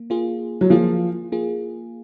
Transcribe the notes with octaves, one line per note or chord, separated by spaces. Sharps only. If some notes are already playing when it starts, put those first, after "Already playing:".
Already playing: A#3
A#3 F4 G#4
F#3
F3 A#3 F4 G#4
A#3 F4 G#4